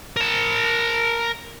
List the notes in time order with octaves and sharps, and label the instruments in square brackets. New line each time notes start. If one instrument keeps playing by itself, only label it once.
[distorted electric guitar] A#4 A5